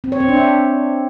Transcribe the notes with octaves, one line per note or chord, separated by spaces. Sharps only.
C4
C#5
C4
D4
E5